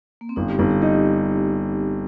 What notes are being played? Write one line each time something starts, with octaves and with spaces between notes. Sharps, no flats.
A#3
C4
G1 D#4
G4
G1 D#4
G4
D#4 G4